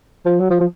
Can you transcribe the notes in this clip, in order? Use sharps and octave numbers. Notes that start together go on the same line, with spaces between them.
F3
F#3
F3
F3